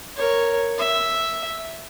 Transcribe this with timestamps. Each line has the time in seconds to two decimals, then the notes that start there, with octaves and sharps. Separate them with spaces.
0.16 A#4 C#5
0.78 E5